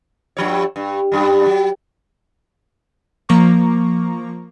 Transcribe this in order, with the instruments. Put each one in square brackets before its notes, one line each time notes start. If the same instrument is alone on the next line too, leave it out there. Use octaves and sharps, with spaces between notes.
[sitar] G2 F3 C#5
G2
F#2 G3
F#3
[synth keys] F3 A#3 A#5 C#6 D6